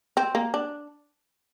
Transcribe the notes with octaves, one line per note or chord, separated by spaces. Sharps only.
C4
A#3
D4